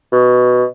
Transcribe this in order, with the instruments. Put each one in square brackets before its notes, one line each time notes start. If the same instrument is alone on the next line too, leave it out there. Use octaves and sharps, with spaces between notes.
[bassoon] B2